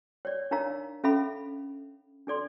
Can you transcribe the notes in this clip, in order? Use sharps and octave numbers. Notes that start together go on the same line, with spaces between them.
C#5 D5
D4 D#4 A#4 C#5 F5 A#5
C#4 A4 E5 F5 B5
D4 A4 D5 C6